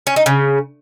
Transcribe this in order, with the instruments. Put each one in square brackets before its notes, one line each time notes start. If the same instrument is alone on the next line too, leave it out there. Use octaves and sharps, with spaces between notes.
[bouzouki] C#4
D#4
C#3